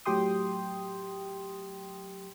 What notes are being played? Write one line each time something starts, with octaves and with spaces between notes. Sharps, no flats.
A2 F#3 G4 G5 C6 D#6